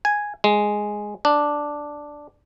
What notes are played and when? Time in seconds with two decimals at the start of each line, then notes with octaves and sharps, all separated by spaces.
0.05 G#5
0.44 G#3
1.25 D4